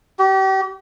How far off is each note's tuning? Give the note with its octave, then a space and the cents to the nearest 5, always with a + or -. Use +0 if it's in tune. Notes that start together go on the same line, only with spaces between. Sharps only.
G4 -35